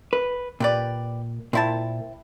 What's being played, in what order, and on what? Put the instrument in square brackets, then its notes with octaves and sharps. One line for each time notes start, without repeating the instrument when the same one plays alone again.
[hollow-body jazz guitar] B4
[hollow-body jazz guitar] A#2 [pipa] G4 B4 D5
[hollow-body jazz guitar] A#2 [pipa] C4 E4 A5